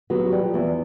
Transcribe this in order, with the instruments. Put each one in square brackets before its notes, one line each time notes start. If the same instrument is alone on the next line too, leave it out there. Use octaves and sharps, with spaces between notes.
[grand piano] F#3 [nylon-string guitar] B3
[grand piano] F#3
[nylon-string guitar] G3
[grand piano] F3
[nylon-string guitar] E2 [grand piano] E3